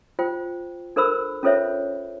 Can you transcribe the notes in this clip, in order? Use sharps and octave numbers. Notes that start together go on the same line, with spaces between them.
F4 C5 G5
D4 A4 A#4 C5 B5 E6
C#4 F4 A4 C5 C#5 E5